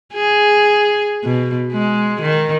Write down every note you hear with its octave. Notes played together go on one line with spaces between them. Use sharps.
G#4
B2
G#3
D#3